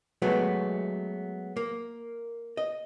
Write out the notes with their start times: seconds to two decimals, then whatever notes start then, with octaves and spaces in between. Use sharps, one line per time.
0.22 F#3 G#3 A3 B3
1.56 A#3
2.57 D#5